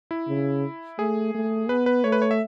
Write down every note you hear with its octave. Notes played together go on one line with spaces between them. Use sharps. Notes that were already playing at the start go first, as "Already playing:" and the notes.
E4
C#3
A3 G#4
A3
B3 B4
B4
A3 C#5
B4
C#5
E5